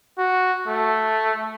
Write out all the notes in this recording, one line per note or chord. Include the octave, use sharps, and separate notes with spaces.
F#4
A3